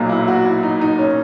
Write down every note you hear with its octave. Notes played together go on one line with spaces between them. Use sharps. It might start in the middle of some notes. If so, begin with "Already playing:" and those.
Already playing: B1 A#2 F#3 A#3
E4
F#4
E4
D#4
D#4
C#4